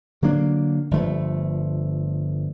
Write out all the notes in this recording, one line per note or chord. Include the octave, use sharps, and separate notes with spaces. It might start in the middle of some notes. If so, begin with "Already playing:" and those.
D3 F#3 A#3 D4
G1 F3 A3